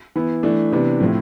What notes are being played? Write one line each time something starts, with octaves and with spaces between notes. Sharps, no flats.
E3 B3 E4
E3 A3 D4
C3 E3 B3 D4
A2 F3 C4 E4